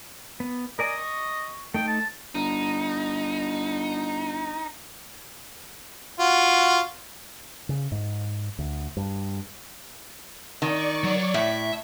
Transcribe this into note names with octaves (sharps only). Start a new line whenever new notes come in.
B3
A#4 D5 D#5 G#5
C#6
A3 D#4 A4 G5
A5
G1 D#4
F4 F#4
C#3
G#2
D2
G2
D#3 D5 C#6
F#3
A2 E5